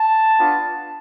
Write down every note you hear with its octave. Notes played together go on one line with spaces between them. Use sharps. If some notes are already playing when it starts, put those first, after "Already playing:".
Already playing: A5
B3 D4 F4